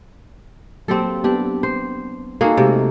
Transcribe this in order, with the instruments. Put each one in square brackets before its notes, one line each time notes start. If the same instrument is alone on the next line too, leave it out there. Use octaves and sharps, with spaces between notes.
[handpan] F#3 A#3 [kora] C4 G4 A4
[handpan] B3 [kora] D4 G4
[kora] C5
[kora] A#3 F#4 G#4 [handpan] D#4 A4
[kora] C3 [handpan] G#3 A3